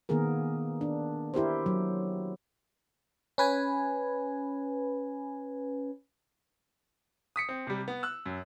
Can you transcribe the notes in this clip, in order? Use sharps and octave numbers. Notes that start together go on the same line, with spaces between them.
D#3 A#3 B3 G#4 A#4
D4
E4 G4 A#4 C5
F#3
C#4 B4 G#5
D#6 B6 C#7
C4
C3 G3
B3
E6 F#6
F#2